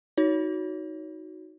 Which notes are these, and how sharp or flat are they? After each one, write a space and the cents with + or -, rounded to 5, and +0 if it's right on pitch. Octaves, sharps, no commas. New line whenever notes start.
D#4 +15 F#4 +0 C#5 +20